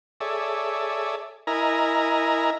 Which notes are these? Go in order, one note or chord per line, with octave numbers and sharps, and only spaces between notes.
G#4 A4 C#5 D5 E5
E4 A#4 D#5 G#5 A#5